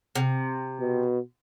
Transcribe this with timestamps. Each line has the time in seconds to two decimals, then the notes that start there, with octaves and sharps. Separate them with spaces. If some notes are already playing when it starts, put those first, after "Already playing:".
0.15 C3
0.80 B2